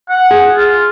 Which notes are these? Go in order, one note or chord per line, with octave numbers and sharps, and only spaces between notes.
F#5
G#4
F4